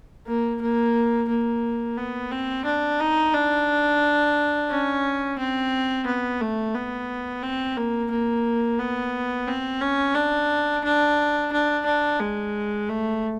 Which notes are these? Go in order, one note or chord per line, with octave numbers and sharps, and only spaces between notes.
A#3
A#3
A#3
B3
C4
D4
D#4
D4
C#4
C4
B3
A3
B3
C4
A#3
A#3
B3
C4
C#4
D4
D4
D4
D4
G#3
A3